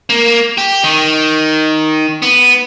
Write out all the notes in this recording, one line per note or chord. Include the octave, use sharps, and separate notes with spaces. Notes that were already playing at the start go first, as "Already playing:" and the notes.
A#3
G4
D#3
B3